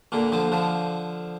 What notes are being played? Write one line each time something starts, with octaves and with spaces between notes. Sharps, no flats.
A#2 D3
D3 F3
D3 F3